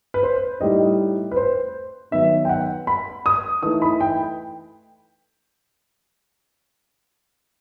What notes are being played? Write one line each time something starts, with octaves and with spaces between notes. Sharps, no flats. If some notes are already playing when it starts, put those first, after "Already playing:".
B4
C5
A2 G3 D#4 D#5
B4
C5
D#3 F#3 B3 D#4 E5
G5
F#5
B5
D#6
E3 A3 D#4 D#6
B5
G5